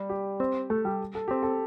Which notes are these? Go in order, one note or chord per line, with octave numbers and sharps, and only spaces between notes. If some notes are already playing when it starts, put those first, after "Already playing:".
Already playing: G3
G4
C4
A3 A4
G3 G4
A4
C4 G4
A4